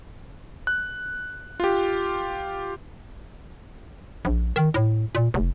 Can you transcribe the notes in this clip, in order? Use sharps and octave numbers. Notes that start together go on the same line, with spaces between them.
F#6
F4 G4
A#1
D#3
A2
A#2
F1